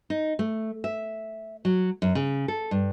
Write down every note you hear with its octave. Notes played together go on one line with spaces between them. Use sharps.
D#4
A3
E5
F#3
F#2
C#3
A4
G2